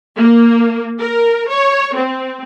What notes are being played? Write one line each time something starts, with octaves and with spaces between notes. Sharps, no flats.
A#3
A#4
C#5
C4